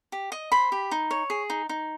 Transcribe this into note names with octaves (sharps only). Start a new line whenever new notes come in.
G4
D#5
C5 B5
G4
D#4
C#5
G#4
D#4
D#4